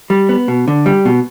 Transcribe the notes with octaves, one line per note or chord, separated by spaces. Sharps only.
G3
B3
B2
D3
G3
B2